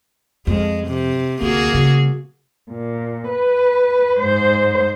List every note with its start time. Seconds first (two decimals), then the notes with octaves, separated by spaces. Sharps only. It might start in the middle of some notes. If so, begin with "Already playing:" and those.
0.47 F2 G#3
0.87 C3
1.41 D2 A#3 F#4 G#4
1.73 C#3 G3
2.71 A#2
3.29 B4
4.20 G#2 C5